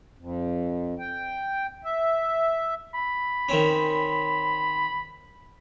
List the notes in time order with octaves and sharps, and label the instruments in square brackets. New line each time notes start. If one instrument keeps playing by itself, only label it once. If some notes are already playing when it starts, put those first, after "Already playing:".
[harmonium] F2
G5
E5
[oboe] B5
[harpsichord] D#3 C4 C#4